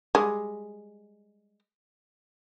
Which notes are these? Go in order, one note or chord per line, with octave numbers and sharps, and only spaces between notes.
G3 G#3